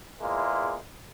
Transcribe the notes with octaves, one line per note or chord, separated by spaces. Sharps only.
E2 G#3 A#3 E4 F4